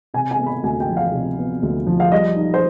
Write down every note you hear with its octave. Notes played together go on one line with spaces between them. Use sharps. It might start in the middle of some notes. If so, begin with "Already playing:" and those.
C3 G#5
G#5
B3
B5
D2 G#5
G5
F3
F5
C3
B3
D2
F3
F5
G3 D#5
D#4
C5